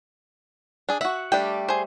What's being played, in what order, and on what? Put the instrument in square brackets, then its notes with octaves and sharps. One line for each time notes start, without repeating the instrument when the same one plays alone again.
[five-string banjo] D4 G#4
[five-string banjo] F#4 E5 [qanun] F#5
[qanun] G3 A3 [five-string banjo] D4 G5
[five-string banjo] G#4 C5